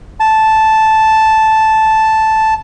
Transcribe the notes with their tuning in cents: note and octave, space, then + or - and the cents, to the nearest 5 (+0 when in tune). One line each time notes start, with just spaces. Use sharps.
A5 -5